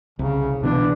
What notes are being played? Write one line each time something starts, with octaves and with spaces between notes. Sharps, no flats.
C2 C#3
B2 E3 B3 D4